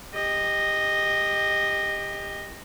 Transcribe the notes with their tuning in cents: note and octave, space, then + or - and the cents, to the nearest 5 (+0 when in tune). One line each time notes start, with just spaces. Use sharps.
G4 +20 D#5 -5